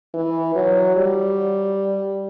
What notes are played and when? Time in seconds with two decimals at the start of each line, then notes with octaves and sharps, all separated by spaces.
0.14 E3
0.55 F#3
0.96 G3